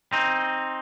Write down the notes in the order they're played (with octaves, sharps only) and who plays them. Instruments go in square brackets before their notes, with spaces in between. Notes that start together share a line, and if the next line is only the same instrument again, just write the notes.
[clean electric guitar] C4 D#4